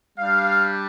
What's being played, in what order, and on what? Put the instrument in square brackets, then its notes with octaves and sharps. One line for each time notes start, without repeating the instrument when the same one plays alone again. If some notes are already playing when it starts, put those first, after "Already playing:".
[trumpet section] G3 D4 G4 F5